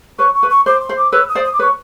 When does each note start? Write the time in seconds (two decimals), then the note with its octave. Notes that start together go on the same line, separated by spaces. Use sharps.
0.19 B4 C#5 C#6
0.34 C#6
0.43 B4
0.50 C#6
0.66 C5 D6
0.81 C6
0.89 C5
0.97 D6
1.12 B4 C#5 E6
1.29 D#6
1.35 C5 D5
1.44 D#6
1.53 D6
1.59 B4 C#5 C#6